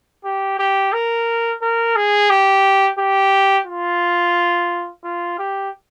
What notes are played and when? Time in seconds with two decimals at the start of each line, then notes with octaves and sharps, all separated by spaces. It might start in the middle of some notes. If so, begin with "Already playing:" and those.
0.24 G4
0.59 G4
0.93 A#4
1.62 A#4
1.96 G#4
2.30 G4
2.99 G4
3.67 F4
5.04 F4
5.39 G4